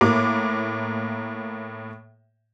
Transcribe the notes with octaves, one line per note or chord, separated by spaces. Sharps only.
A2 A#3 D6